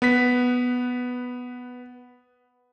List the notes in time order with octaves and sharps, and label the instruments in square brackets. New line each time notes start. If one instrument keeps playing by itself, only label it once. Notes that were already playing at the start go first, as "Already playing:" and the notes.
[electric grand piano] B3 B4 B6